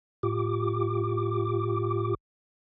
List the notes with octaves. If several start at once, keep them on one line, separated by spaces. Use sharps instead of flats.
A2 F4 G4 D6